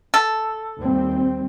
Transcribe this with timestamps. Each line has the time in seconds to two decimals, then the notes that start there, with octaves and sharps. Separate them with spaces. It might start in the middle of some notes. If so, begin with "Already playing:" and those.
0.14 A4
0.80 D#2 G3 C4